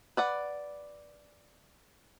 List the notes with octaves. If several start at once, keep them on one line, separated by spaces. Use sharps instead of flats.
B4 D5 F#5